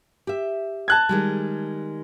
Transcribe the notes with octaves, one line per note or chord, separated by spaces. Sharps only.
G4 E5
A5 F#6 G#6
D#3 G3 G#3